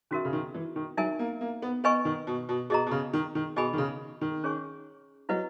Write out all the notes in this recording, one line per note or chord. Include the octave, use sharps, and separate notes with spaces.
D#3 C#4 F#4 A#4 E5
C#3
D#3
E3
D#3
F#3 D#4 A#4 E5 G#5
A#3
A#3
B3
B3 B4 D#5 G#5 C#6
D#3
B2
B2
B2 G#4 D#5 A#5
B2
C#3
D#3
D#3
B2 G#4 D#5 G#5 B5
D#3
C#3
D#3
C#4 G#4 C#5 G#5 C#6
F#3 E4 B4 D#5 F#5